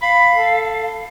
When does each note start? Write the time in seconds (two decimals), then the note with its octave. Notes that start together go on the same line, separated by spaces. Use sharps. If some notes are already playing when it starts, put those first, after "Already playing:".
0.02 F5 B5
0.34 A4